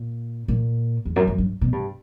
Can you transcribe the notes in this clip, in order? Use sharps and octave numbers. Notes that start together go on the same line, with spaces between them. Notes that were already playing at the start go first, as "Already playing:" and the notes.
Already playing: A#2
A#2
E2
F#2
F#2
G2
B2
G2